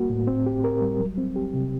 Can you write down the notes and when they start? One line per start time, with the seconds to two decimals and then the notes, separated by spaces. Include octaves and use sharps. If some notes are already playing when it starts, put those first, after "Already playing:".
Already playing: G3 A#3 F#4
0.10 A2
0.27 C4
0.46 G4
0.64 A#4
0.81 G3
1.00 F#3
1.17 C4
1.36 G4
1.54 C3